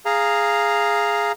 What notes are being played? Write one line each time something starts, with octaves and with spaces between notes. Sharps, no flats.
G#4 F5 A#5